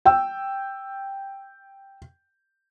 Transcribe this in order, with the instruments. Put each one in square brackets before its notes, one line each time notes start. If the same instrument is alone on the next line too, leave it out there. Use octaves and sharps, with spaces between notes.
[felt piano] G5 E6